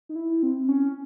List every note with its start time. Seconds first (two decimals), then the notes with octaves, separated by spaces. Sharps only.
0.09 D#4
0.16 E4
0.43 C4
0.69 C#4